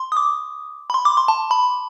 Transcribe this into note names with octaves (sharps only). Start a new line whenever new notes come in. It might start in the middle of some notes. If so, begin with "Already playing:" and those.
Already playing: C6
D#6
D6
B5
C6
D6
C6
A5
B5